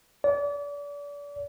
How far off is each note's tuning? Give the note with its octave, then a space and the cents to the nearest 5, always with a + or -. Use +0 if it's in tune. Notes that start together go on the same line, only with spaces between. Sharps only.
D5 -35